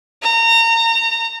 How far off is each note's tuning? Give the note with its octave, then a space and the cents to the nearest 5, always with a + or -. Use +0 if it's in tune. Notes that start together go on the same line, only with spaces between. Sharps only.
A#5 -30